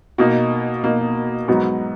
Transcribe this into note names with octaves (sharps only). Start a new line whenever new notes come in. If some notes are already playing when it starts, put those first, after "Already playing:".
B2 A#3 D#4
B2 A#3 D#4
G#2 F#3 B3 D#4 F#4